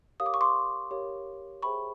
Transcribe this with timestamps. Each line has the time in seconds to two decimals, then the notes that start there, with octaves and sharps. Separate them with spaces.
0.20 G4 A#4 C#5 F5 D#6
0.26 D6
0.34 C#6
0.41 C6 D6
0.91 G4 A#4 C#5 F5
1.62 G#4 C5 E5 G5 B5 C#6